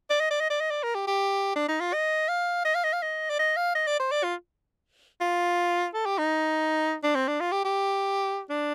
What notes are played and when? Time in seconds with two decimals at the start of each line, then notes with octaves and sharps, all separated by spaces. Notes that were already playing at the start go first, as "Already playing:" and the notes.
0.10 D5
0.20 D#5
0.30 D5
0.40 D#5
0.50 D5
0.61 D#5
0.71 D5
0.83 A#4
0.95 G4
1.07 G4
1.56 D4
1.68 D#4
1.80 F4
1.93 D#5
2.29 F5
2.65 D#5
2.74 F5
2.84 D#5
2.93 F5
3.02 D#5
3.30 D5
3.39 D#5
3.57 F5
3.75 D#5
3.87 D5
3.99 C5
4.11 D5
4.23 F4
5.21 F4
5.94 A4
6.06 G4
6.18 D#4
7.03 D4
7.15 C4
7.28 D4
7.40 F4
7.52 G4
7.64 G4
8.49 D4